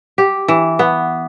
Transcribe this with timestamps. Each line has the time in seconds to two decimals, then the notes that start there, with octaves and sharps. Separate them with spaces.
0.18 G4
0.48 E3
0.79 B3